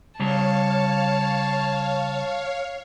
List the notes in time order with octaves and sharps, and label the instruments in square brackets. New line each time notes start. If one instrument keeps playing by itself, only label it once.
[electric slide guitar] C#3 G3 A#5 [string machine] C#5 F5 [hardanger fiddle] A5